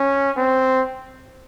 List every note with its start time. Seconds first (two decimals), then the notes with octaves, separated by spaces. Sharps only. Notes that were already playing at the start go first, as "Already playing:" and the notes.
Already playing: C#4
0.37 C4